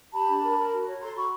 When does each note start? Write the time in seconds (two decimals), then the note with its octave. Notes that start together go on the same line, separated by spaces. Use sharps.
0.13 G4 A5 B5
0.28 D4
0.42 A#4
0.57 A#4
0.71 F#4
0.86 C#5
1.00 A4 A#5 C6
1.15 F#4 B5 C#6